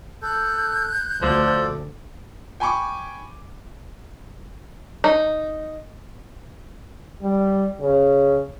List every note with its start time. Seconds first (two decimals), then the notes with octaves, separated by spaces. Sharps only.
0.22 A4 F#6 G6
1.22 D2 F3 A4 D5
2.60 G5 G#5 B5 C#6 D6
5.04 D#4
7.22 G3
7.81 C#3